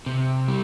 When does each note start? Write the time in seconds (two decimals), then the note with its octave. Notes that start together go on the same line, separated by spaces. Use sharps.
0.06 C3
0.48 G3